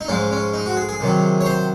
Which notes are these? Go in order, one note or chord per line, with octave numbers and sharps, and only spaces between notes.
D#4
G#2 F3 G#3 C#4
C#4
D#4
F#4
G#4
G#4
C3 D#3 F#3
C#5
C5